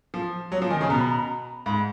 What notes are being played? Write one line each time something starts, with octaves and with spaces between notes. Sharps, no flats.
F3
F#3 C#5
F3
D#3 G#5
C#3
B2 A#5
B5
A#5
G#2 B5